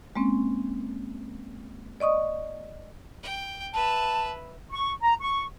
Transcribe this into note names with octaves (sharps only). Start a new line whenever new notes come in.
G#3 A#3 C4 C#4
D5 D#5 C#6 D#6
G5
B4 E5 A5
C#6
A#5
C#6